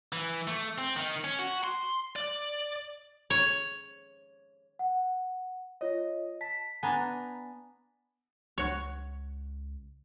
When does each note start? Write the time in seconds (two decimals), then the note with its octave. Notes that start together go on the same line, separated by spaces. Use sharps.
0.13 E3
0.47 A3
0.78 C4
0.96 D#3
1.24 C#4
1.39 F#4
1.64 C6
2.16 D5
3.30 C#5
4.79 F#5
5.81 F4 C#5 D#5
6.41 A5 B6
6.83 B3 D4 G#5 A#5
8.58 C#2 F#4 C#5